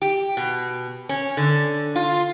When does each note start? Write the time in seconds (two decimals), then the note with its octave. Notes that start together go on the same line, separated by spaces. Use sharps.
0.02 G4
0.37 B2
1.09 C#4
1.37 D3
1.96 F4